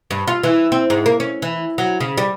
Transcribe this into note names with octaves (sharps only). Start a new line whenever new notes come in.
G2
F4
E3
C4
G#2
A#3
C#4
E3
F#3
C#3
G3